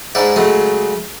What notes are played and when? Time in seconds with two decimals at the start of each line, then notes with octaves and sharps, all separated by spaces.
0.15 G#2 D4 E4
0.36 C#3 F#3 G#3 A3